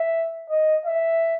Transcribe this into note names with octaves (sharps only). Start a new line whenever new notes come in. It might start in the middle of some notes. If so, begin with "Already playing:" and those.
Already playing: E5
D#5
E5